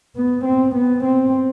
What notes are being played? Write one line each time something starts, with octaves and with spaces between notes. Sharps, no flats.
B3
C4
B3
C4